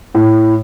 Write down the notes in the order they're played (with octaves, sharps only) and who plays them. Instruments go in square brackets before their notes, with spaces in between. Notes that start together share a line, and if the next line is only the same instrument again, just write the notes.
[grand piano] A2